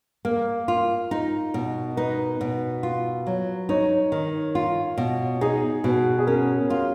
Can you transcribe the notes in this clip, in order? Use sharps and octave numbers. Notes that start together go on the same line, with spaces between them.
A#3 A#4
F4
D#4
B2
D#4 B4
B2
F4
F#3
D#4 C#5
D#3
F4
B2
D#4 G#4
B2 F#4
G#4
C#4 A#4
F4